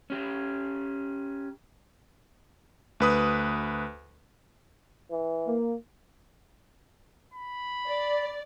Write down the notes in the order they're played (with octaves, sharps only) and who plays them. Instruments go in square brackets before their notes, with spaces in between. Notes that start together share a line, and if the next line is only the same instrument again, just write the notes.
[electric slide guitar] C#4 G4
[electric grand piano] D2 B4 D#6
[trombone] E3
[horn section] A#3
[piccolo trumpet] B5
[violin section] D5